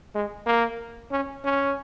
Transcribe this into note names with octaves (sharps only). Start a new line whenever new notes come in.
G#3
A#3
C#4
C#4